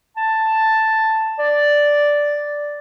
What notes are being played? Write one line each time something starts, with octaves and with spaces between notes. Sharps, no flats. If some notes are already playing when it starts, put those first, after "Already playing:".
A5
D5